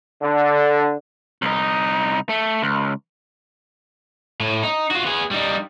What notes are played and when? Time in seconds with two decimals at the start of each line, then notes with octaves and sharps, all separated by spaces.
0.22 D3
1.42 C2 D#4
2.29 A3
2.63 C#2
4.40 A2
4.63 D#4
4.91 F4 F#4
5.06 B3 G#4
5.31 G3 D#4